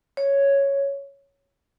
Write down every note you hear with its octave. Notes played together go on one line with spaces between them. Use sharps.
C#5